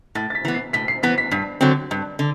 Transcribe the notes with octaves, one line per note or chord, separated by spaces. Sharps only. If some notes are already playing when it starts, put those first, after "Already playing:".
A2 A6
A6
B6
E3 B3
C7
A2 B6
C7
E3 B3 B6
B6
G2 B6
D3 F#3 C4
G2
D3